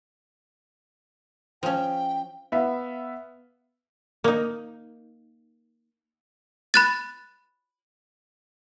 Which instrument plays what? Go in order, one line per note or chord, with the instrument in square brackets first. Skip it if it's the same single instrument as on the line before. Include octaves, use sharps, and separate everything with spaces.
[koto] F3 C#4 [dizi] G5
[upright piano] B3 E5 F5
[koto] A#3 D#4
[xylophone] B5 F#6 A6